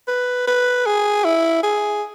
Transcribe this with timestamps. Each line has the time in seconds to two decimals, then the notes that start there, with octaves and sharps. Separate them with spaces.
0.07 B4
0.47 B4
0.86 G#4
1.24 E4
1.63 G#4